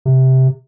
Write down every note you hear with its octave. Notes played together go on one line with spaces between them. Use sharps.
C3